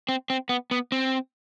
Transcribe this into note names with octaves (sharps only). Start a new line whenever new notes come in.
C4
C4
B3
B3
C4